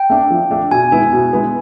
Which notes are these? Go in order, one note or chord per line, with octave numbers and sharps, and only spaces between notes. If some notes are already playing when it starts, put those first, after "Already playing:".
Already playing: G5
A3 D4
F3
A3 D4
B2 G#5
G#3 B3 E4
B2
G#3 B3 E4